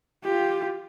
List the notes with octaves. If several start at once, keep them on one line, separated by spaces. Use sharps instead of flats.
F4 G4